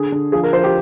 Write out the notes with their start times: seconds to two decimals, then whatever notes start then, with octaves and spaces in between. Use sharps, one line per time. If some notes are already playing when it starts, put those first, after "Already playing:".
Already playing: D3 G#4
0.12 D3
0.32 F3 G#4
0.44 A#4
0.53 F3 C5
0.64 G4